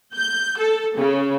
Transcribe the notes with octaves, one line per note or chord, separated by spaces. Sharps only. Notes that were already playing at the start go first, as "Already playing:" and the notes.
G6
A4
C#3